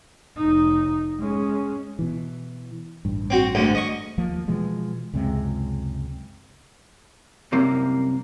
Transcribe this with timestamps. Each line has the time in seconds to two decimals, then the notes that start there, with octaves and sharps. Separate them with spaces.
0.37 F1 D#4
1.20 G#3 C#4
1.99 B2 E3
3.05 A1 G2
3.30 C4 F#4
3.55 D2 G#2 D3
3.75 D#5 C#6
4.18 D#2 F3 A#3
4.48 B2 E3 F3 G#3
5.13 C#2 F#2 C3 G#3
7.52 C2 F#2 C3 A#3